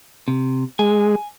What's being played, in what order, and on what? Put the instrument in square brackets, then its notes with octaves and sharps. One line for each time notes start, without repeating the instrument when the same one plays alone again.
[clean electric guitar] C3
[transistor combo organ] G#3 [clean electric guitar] G#5